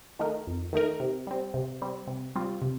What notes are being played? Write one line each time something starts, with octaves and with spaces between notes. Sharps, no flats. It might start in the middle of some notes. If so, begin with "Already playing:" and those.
D#3 A3 D#4 A#4
F2
D#3 A3 D#4 A#4
C3
G3 C4
C3
G3 C4
C3
G3 C4 F4
C3